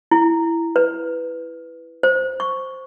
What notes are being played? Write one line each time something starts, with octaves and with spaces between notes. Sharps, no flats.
E4
B4
C5
C#6